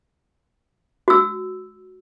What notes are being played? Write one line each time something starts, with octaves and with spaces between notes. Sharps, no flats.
F#4 E6